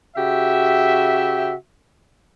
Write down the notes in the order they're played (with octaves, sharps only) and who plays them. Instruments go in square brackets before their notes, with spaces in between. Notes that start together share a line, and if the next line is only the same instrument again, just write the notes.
[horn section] C#3 F#4 G4 E5